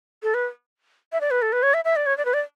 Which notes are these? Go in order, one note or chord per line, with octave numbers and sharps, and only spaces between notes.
A4
B4
E5
D5
B4
A4
B4
C#5
E5
E5
D5
C#5
D5
B4
D5